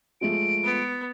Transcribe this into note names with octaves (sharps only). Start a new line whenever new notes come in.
F3 G#3 A3 D7
B3